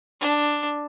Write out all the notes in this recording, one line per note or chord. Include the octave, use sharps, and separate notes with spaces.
D4